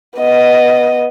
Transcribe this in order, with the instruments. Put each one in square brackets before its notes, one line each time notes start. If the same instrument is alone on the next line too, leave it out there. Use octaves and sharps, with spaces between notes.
[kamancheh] B3 D#5